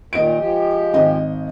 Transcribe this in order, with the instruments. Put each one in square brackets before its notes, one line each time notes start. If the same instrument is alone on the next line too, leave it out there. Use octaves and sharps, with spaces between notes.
[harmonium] A#2 D#3 [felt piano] D#5 D7
[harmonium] F3 G#3 G4
[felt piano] G#1 D#5